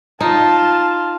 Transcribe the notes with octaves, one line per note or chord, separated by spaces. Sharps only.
D#4 F4 A5